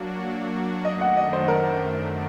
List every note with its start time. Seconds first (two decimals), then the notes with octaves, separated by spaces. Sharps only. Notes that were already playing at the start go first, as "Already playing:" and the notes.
Already playing: F#3 A#3 D4 F#4
0.85 F#2 D#3 A3 D4 D#5
1.01 F#5
1.17 D#5
1.33 C5
1.48 A#4